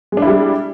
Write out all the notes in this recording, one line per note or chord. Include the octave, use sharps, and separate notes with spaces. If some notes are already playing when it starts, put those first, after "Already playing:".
G3 G#3 D4 E4